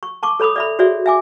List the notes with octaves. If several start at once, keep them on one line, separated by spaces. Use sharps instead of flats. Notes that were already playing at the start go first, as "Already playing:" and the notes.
C#6
A5 C#6 D6
A4 C#5 B5 D6 D#6
D5 E5 B5
F#4 G#4 C#5 D5 E5
E5 G#5 D6